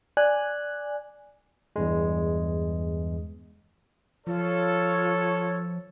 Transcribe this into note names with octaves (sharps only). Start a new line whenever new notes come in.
D5 G#5 F#6
E2 G2 G#3
F3 F4 A4 C#5